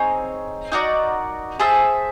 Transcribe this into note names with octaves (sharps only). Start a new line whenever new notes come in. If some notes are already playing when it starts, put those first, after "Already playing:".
Already playing: C4 D#4 G#4 C#5
D#4 F#4 A#4 D5
G#4 C5 E5 A5